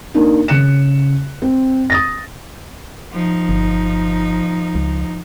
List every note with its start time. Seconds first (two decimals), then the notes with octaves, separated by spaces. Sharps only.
0.14 A#3 D4 D#4
0.48 C#3 F#6 C#7 E7
1.42 C4
1.90 D#6 A6 A#6
3.11 F3 D#4
3.49 G1
4.75 C#2